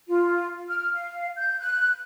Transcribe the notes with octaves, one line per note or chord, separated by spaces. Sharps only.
F4
F6
F5
G6
F#6